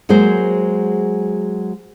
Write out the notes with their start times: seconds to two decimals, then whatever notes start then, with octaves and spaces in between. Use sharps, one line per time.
0.09 F#3 G#3 A#3 G#4 C5